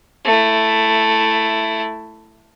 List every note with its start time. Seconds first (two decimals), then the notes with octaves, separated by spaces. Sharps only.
0.25 A3 E4